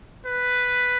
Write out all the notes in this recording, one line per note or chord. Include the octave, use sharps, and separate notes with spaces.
B4